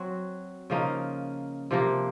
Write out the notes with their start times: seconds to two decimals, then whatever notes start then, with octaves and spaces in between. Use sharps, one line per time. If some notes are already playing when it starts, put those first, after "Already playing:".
Already playing: F#3 C4 F#4
0.70 C#3 F3 A#3 D#4
1.71 C3 F3 A#3